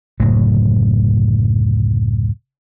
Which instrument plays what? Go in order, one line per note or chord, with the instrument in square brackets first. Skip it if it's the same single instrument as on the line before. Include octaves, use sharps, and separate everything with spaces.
[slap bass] F#1 D2 A2 F#3